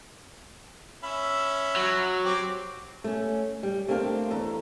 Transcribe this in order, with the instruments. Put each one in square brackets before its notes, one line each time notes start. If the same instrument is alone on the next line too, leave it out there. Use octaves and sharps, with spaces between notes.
[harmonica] C#4 E5 B5
[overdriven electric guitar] F#3
[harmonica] C4 G4 D6
[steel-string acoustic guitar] A3 C#4
G3
A3 A#3 C4 D4 F5
E2 A4 A#5